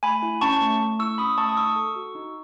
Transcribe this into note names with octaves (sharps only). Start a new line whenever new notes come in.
A3 G#5 B5
E4
C#4 A5 C#6
A3
A3
E4 C#6 E6
C#4 B5 D#6
A3 A5 C#6
D#6
D#4 C#6 E6
A4
F#4
D#4